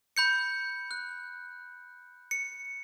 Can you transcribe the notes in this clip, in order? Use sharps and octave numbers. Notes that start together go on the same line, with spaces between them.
B5 G6 C#7
F#6
C#7